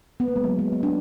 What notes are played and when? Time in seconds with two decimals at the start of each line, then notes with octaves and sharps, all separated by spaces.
0.20 B3
0.28 A#3
0.36 G#3
0.44 F#3
0.59 G#3
0.73 B3
0.83 D4